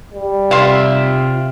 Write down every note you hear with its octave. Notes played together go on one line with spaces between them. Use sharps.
G3
C3 F4 E5 F5 C6